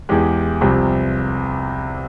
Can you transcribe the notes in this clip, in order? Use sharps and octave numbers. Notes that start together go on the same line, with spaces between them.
E2 E3 G#3 G4
C2 C3 F3